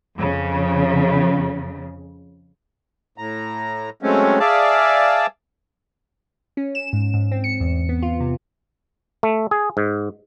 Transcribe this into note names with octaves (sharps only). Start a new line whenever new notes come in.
F2 C#3
A2 A#5
F#3 G#3 A3 C4 C#4
G#4 D5 E5 F5 A5
C#4
E7
G#2
G#2
C4
C#7
E2
B3
F4
C3
A3
G#4
G#2